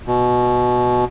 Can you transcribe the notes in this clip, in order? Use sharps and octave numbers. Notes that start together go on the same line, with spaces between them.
B2